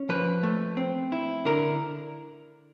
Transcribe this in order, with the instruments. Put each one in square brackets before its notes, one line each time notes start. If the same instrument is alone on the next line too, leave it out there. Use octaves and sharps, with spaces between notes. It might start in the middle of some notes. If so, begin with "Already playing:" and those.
Already playing: [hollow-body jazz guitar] C#4
F3 B4
A3
C4
E4
D3 A#4